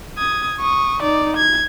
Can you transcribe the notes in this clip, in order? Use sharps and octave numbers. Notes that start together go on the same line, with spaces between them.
D#6 G#6
C#6 D#6
D#4 D5
G#6